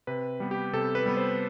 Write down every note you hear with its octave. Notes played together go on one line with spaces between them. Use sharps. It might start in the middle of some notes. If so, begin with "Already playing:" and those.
C3 B4
G3 B3
G4
C3 A4
B4
G3 B3
C5